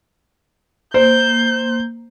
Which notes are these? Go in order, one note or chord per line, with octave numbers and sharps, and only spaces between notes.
A#3 C5 G6